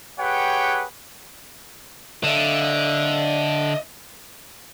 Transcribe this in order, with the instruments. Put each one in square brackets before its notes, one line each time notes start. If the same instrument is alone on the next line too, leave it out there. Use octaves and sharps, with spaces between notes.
[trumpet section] G4 G#4 B4 C#5 F#5 G5
[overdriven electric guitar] D3 [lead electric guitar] D#5 E5